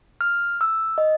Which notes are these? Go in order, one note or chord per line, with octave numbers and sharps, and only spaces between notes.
F6
E6
D#5